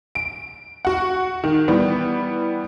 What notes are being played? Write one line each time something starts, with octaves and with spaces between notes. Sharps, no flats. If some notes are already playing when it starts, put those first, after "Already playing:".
D7
F#4 F#5
D#3
E3 G3 B3